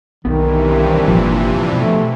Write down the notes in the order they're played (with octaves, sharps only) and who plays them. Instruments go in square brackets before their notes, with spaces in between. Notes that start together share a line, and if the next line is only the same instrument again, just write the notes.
[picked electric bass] B1 B3 [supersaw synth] G2 C3 E3 [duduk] D#3
[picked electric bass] G1 A#2 [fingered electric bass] F3
[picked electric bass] B2 [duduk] A3